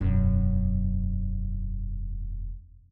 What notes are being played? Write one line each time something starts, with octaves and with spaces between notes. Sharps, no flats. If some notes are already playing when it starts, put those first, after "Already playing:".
E1 F#2